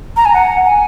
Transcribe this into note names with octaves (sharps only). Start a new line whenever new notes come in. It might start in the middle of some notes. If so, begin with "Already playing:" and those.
A#5
G#5
F#5
G#5